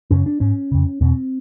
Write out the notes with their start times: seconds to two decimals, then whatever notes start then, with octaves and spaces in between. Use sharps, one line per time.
0.11 F#2 C#3 C#4
0.26 D4
0.40 G#2 C#4
0.72 F2 C#3
1.01 E2 B2 C4